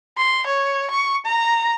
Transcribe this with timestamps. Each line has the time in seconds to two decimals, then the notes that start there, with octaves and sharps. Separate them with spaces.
0.17 C6
0.46 C#5
0.90 C#6
1.25 A#5